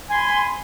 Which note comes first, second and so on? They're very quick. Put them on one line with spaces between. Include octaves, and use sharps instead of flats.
G#5 C6 B5